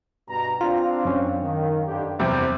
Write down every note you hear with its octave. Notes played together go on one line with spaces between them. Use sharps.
G2 B2 A#5
C4 D4 F4 F5
F#2 C#4
D#3
G2 D3 G4
E2 C3 G3 C5 E5